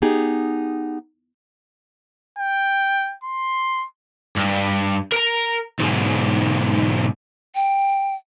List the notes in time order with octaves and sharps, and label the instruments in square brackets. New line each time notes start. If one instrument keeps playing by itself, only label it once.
[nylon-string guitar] B3 D#4 G4 G#4
[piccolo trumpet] G5
C6
[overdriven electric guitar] G2
A#4 A#5
B1 G#2
[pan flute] G5